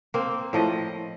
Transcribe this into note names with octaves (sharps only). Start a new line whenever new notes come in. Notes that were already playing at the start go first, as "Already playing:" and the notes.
A#3 C4
A2 F3 D#5